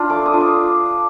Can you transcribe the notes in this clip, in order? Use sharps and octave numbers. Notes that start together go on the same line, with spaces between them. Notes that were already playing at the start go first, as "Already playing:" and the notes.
Already playing: D4 F4
A3 D6
D#6
D4 F4
D6